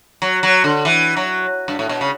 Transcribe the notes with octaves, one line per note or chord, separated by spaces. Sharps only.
F#3
F#3
D3
E3
F#3
G2
A2
B2
C#3